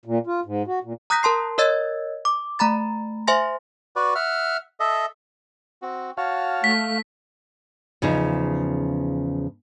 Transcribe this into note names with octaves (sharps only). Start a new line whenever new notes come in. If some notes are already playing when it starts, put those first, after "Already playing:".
A#2
F4
G#2
F#4
A#2
A#5 D#6 F#6 G6 A#6 B6
A#4 A5 C6 C7
A#4 C#5 D#5 E6 G#6 A6
D6
A3 A#5 B5 A6
C5 E5 G#5 C6 A#6
F#4 B4 D5
E5 F#5 F6
A4 D#5 E5
C4 F#4
F#4 C#5 F5 A5
A3 B6
E2 C#3 F3 D#4